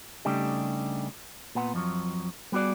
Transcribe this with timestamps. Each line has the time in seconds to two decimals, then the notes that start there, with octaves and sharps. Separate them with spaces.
0.25 C#3 G3 A3 D4 D#4 G4
1.55 A#2 B3 F#5
1.74 F2 F3 F#3
2.52 G3 B3 F#4 G#4 D5